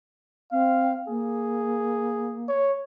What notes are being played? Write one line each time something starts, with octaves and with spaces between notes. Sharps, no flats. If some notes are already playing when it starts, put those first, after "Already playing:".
C4 F5
A#3 G#4
C#5